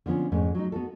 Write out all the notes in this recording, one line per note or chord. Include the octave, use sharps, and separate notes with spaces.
D3 F3 B3 C#4
F2 G#2 A3 C#4
F#3 D#4
B3 F#4 A4